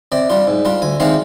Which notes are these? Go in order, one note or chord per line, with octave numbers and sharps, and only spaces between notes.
C3 D5
G3 D4 F4
G#2
G3 D4 F4
D2 G#5
C3 D#3 G#3 D4 F5